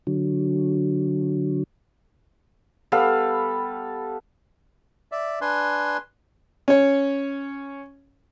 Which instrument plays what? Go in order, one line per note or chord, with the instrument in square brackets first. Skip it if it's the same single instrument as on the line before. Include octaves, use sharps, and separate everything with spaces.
[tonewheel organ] D3 F#3
[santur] G3 B3 A4 F5
[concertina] D5 E5
D4 B4 G#5 C6
[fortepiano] C#4 C#5